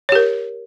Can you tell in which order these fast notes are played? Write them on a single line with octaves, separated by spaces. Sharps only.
C#5 G4 A#4